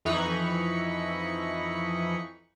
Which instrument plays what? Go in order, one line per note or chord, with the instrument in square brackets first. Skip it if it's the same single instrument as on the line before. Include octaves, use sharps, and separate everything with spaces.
[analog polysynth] F2 E3 D#4 B5 C#6